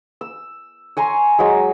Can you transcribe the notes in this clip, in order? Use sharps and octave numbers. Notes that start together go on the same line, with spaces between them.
E6
C#5 G#5 A#5 C6
F#3 G#3